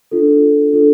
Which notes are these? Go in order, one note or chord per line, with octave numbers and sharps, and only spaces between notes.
D4 F4 A4
D4 F4 A4